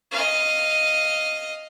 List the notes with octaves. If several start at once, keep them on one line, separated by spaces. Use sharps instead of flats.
D#5 F5